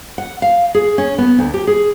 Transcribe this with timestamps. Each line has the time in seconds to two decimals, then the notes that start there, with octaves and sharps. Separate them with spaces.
0.18 F#5
0.42 F5
0.74 G#4
0.98 C#4
1.18 B3
1.39 D2
1.54 G4
1.67 G#4